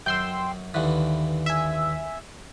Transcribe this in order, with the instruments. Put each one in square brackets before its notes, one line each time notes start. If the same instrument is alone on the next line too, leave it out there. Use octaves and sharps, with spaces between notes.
[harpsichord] F#2 [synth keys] G5 C6 E6
[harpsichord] D#2 D3 E3 [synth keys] B4
[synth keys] E5 G#5